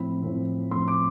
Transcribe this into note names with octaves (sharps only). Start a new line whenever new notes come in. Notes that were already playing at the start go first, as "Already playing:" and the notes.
Already playing: A2 F3 C4 B5
A2 F3 C4
A2 F3 C4 C6
D6